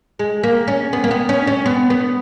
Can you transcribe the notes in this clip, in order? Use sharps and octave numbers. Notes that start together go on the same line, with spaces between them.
G#3
A#3
C#4
B3
A#3
B3
C#4
C#4
B3
B3